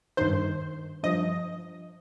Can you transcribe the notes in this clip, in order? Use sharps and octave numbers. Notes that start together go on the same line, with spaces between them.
G2 D#3 C5 C6
G2 F3 D#5 D#6